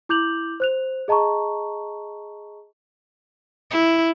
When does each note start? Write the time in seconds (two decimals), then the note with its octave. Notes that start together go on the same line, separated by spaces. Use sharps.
0.09 E4 D6 G6 F7 F#7
0.60 C5 F#6 F7
1.08 G#4 D#5 A5 A#5 C#6
3.71 E4